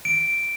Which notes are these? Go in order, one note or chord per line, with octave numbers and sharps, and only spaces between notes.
D7